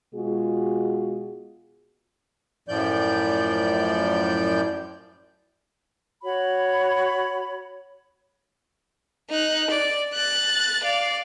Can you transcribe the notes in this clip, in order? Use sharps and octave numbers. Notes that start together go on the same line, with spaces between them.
B2 G#3 F4 F#4 G#4
F#2 A2 F3 D5 G6
F#4 C#5 B5
D#4 F#6
D5
F#6 A6
D5 F5